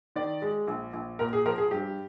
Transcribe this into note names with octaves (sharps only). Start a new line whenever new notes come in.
D#3 D5
G#3
A#1
A#1
A#2 A#4
G#4
F3 A#4
G#4
G2 G4